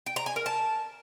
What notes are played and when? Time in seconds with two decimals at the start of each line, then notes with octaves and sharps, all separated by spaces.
0.06 G5
0.16 A#5
0.26 G#5
0.36 A#4
0.46 A5